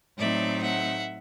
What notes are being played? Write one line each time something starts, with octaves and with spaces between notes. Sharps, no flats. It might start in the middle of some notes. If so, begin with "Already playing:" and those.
A2 F#3 A3 C4 D#4 D5 E5
E5 F#5